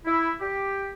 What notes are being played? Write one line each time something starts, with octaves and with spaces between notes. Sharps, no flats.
E4
G4